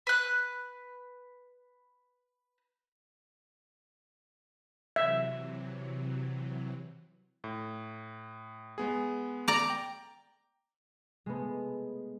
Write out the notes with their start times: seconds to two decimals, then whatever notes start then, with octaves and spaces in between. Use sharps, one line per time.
0.07 B4 F#6
4.96 C3 E3 F#3 E5
7.44 A2
8.78 G#3 B3 G#4
9.48 D5 A#5
9.70 G5
11.26 G#3 A3 B3